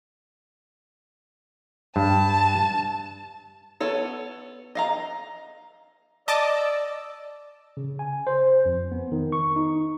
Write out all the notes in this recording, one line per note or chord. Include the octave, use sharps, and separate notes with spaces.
G2 A5
B3 A4 C#5
D#5 F5 A#5
D5 D#5 A5 D6 E6
C#3
G#5
C5
F2
B3
D#3
C#6
D#4